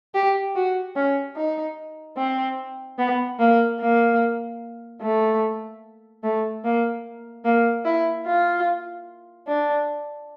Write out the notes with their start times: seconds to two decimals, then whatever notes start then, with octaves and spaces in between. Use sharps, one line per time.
0.14 G4
0.55 F#4
0.95 C#4
1.36 D#4
2.17 C4
2.98 B3
3.39 A#3
3.80 A#3
5.01 A3
6.23 A3
6.64 A#3
7.45 A#3
7.85 E4
8.26 F4
9.48 D4